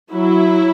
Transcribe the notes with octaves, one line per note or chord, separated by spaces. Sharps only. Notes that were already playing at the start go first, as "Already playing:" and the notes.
F#3 E4